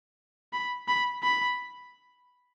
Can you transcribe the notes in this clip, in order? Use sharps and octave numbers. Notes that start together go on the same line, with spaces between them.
B5
B5
B5